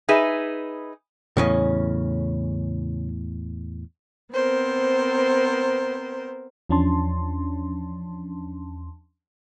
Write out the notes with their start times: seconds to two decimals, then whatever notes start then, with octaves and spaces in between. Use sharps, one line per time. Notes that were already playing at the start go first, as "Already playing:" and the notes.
0.09 D#4 G#4 B4 E5
1.37 E2 A2 C#3 C#4 D#5
4.34 B3 C4 A#4 C5
6.69 E2 F3 C#4 D4 A5 C6